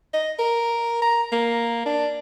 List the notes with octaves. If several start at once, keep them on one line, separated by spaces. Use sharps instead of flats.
D#5
A#4
A#5
A#3
D4